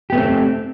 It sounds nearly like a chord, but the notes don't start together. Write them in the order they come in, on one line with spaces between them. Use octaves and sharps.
G4 B3 A3 C4